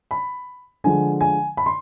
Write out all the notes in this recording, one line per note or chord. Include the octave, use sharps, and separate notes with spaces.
B5
D3 F3 G#3 G#5
G#5
B5
C6